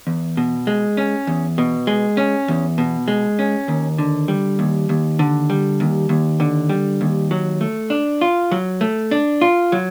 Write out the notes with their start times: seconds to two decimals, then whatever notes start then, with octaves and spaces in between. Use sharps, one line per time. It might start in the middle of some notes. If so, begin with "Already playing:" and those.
0.07 E2
0.37 B2
0.67 G#3
0.97 C#4
1.27 E2
1.58 B2
1.87 G#3
2.17 C#4
2.48 E2
2.78 B2
3.08 G#3
3.39 C#4
3.68 D#2
3.98 D3
4.28 G3
4.59 D#2
4.89 D#2
5.19 D3
5.50 G3
5.80 D#2
6.09 D#2
6.40 D3
6.69 G3
7.01 D#2
7.31 F#3
7.61 A3
7.90 D4
8.21 F4
8.51 F#3
8.81 A3
9.11 D4
9.41 F4
9.72 F#3